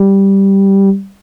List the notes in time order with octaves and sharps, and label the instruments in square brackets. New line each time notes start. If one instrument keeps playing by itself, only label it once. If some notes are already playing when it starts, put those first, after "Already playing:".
Already playing: [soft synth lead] G3